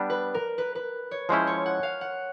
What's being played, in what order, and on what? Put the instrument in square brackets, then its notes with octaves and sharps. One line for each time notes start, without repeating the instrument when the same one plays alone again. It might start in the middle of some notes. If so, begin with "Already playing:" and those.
Already playing: [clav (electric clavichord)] G3 B3 D4
[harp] B4
A#4
B4
B4
C#5
[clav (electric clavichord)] F3 G#3 C#4 E4 [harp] C5
[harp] C#5
F#5
F5
F#5